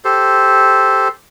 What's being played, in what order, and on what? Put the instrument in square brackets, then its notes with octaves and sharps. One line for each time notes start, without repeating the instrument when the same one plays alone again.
[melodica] G4 A4 C5